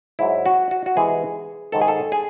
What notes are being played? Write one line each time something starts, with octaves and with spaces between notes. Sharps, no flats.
G#2 F#3 E4
F#4
F#4
F#4
C3 E3 G#3 G#4
G#2 D#3 G#3 A4
G#4
A4
G#4